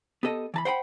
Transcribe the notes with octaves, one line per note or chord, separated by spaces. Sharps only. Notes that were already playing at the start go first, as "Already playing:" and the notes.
B3 G4 A4 D#5
E3 A5 B5
C5 F#5 G5 B5